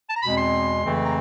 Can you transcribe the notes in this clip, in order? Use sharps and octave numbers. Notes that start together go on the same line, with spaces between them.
A5
A#5
E2 B2 G#3 C4 B5
C6
F2 C#3 E3 A3 C4
A#5